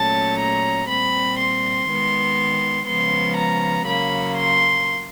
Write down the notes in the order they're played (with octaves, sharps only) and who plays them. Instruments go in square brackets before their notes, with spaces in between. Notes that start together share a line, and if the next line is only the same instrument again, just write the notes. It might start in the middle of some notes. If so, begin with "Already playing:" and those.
Already playing: [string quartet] A#2 F#3 A3 C#4 A5
A#5
A#2 G3 C4 B5
C6
D#3 G#3 B3
C#3 F3 G#3 B3 C6
A#5
C#3 F#3 A#3 B5
C6